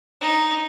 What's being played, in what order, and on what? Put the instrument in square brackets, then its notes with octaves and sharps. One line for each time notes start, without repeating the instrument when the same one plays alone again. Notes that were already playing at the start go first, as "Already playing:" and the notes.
[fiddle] D#4